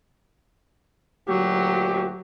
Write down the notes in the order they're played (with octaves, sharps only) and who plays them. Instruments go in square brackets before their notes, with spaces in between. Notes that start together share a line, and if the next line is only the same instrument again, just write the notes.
[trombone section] D2 A#2 G4 [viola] F#3